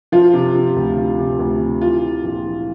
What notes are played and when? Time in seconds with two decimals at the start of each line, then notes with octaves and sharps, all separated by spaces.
0.12 F3 F4
0.33 C3
0.55 C3
0.76 D2
0.98 F3
1.18 C3
1.39 D2
1.60 C3
1.81 E3 F4
2.03 E3
2.24 A#1
2.45 E3